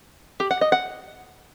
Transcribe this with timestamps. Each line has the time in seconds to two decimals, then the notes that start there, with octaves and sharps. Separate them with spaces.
0.40 G4
0.51 F#5
0.61 D#5
0.72 F#5